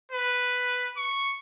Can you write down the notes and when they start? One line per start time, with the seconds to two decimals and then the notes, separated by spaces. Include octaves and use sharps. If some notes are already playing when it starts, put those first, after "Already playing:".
0.12 B4
0.97 C#6